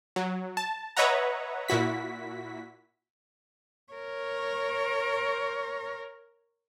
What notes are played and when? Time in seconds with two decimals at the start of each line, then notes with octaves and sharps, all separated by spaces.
0.16 F#3
0.57 A5
0.97 B4 C#5 D#5 E5 F#5 A#5
1.68 A#2 E4 F#4 B6
3.93 A#4 C#5